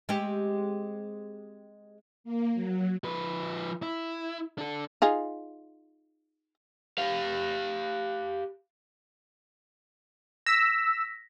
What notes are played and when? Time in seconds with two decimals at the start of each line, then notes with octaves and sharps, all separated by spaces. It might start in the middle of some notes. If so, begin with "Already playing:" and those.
0.09 G#3 C4 G4
2.24 A#3
2.54 F#3
3.04 F3 B4
3.82 E4
4.58 D4 A4
5.02 D#4 F4 G#4
6.98 G4 F5
10.46 E6 A#6 B6